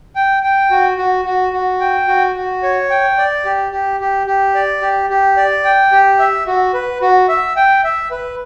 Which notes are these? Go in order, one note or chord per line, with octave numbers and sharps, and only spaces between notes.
G5
G5
F#4
F#4
F#4
F#4
G5
F#4
F#4
C#5
G5
D5
G4
G4
G4
G4
D5
G4
G4
D5
G5
G4
E5
F#4
B4
F#4
E5
G5
E5
B4